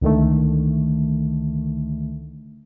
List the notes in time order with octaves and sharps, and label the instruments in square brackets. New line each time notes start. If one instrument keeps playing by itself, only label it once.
[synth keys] C#2 D3 D#3 A3